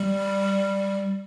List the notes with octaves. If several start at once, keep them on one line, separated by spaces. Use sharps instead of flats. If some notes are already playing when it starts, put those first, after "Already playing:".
Already playing: G3